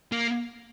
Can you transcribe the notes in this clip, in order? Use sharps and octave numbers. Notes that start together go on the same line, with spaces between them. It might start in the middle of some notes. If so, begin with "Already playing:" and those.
A#3